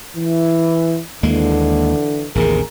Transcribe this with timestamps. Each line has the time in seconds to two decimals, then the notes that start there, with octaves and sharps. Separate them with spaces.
0.16 E3
1.23 D#2 D3 E3 G#3 A#3
2.35 A1 D#2 C3 G#4 A#4